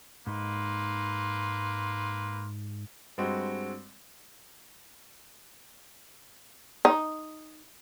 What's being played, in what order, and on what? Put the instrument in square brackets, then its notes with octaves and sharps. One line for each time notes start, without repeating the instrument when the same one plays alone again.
[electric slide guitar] G#2 D#4 [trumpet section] A#3 B4 C6
[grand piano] G2 G#3 C4 F#4
[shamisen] D#4